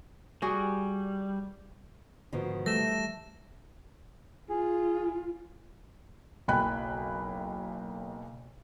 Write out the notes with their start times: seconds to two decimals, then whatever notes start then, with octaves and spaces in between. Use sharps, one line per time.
0.42 G3 F#4 G#4
2.33 G#2 B2 D3 D#3 F3
2.66 E3 G3 A3 A#6 E7
4.50 F4 G#4
6.48 F#1 B1 G5 G#5 B5 F#6